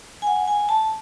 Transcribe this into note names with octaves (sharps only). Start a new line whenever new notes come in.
G#5
F#5
G#5
A5